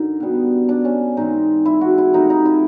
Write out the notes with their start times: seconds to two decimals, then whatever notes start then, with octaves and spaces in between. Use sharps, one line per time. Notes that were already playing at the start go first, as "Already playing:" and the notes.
Already playing: F#2 D3 D#4
0.20 B2 G3 B3
0.69 D4
0.85 C#4
1.17 G#2 E3 G#3 C4 D#4
1.66 E4
1.81 F#4
1.98 E4
2.13 C3 F3 A3 D#4
2.30 D#4
2.45 E4